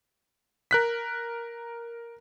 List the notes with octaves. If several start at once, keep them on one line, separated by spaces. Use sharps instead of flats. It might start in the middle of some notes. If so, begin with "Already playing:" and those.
A#4 F#6 B6